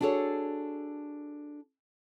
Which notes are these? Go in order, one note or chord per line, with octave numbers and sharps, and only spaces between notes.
D4 F#4 G#4 A4 C#5